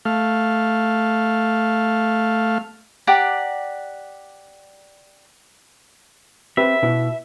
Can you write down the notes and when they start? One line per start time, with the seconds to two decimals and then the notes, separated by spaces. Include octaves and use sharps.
0.05 A3 F5
3.07 G4 D5 F#5 A#5
6.57 C4 G4 B4 E5
6.82 B2 B3 E4